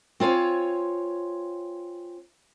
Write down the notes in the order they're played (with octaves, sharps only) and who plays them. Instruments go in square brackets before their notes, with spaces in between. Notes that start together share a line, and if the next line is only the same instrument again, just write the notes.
[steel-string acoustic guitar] C4 F4 C#5 G#5